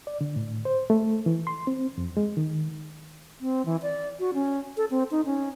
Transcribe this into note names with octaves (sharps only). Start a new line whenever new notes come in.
D5
D3
A2
C5
A3
E3
C6
C4
F2
G#3
D#3
C4
E3
D5
F#4
C#4
A4
C4
D#4
C#4